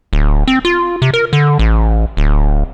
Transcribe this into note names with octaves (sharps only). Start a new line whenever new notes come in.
D1
C4
F4
C3
A#4
D3
A1
D1